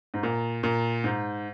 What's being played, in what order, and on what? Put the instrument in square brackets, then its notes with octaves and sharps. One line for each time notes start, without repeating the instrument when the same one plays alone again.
[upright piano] G#2
A#2
A#2
G#2